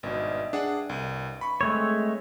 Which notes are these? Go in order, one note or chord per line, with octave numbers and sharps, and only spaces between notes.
G#1 G2 B2 D#5 E5
D4 G#4 F#5
C2 D#7
B5 C#6
G#3 A3 C4 C#5